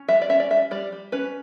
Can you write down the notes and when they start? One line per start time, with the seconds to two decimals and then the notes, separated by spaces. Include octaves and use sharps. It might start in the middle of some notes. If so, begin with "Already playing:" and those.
Already playing: C#4
0.08 G3 E5
0.22 D5
0.29 C#4 E5
0.40 D5
0.50 G3 E5
0.71 G3 D5
0.92 G3
1.12 C#4 B4